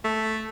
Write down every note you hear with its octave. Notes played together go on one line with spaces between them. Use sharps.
A3